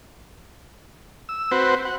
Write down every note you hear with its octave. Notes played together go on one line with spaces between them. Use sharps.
E6
C4 F#4 B4 C5
F#5